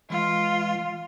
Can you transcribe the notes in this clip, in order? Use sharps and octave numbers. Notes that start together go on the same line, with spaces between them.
E3 G#3 F4